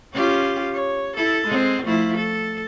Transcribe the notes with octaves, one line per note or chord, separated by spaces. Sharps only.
C#4 F4 G4
C#5
E4 A4
G#3 C4
F3 A3 E4
A4